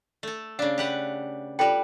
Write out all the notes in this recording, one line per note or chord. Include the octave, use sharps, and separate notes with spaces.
A3 A4
C#3 D4 F5
G4 B4 F#5
G3 F4 A4 B4 G5